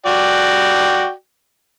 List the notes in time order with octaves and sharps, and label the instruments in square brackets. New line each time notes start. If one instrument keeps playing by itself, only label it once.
[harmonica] F#4 D5 G5